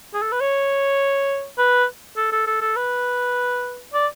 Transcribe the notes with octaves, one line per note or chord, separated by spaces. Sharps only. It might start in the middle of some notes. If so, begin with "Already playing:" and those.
G#4
A4
B4
C#5
B4
A4
A4
A4
A4
B4
D5